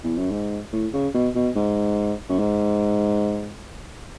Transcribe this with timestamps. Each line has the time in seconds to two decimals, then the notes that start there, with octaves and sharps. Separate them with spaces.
0.04 E2
0.17 F#2
0.31 G#2
0.73 A2
0.93 C#3
1.14 B2
1.35 B2
1.56 G#2
2.29 F#2
2.39 G#2